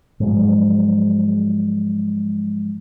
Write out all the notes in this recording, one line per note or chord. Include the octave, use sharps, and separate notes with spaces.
G#2 F3 F#3 G#3